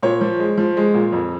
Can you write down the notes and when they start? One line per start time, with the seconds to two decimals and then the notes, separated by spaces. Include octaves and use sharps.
0.03 A#2 C#5
0.21 F3
0.39 G#3
0.58 F3
0.77 G#3
0.94 A#2
1.12 F2